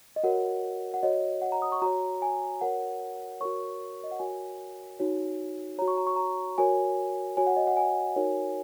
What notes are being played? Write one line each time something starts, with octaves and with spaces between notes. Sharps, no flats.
D#5
F#4 A#4 C#5 F#5
F#5
F#4 C#5 D#5
F#5
A#5
D#6
C#6
F#4 C#5 A#5
G#5
F#4 A#4 C#5 F#5
F#4 A#4 C#5 C#6
D#5
F#5
F#4 A#4 C#5 G#5
D#4 F#4 C#5
F#4 C#5 A#5
C#6
A#5
C#6
A#5
F#4 A#4 C#5 G#5
F#4 C#5 G#5
F#5
D#5
F#5
G#5
D#4 F#4 A#4 C#5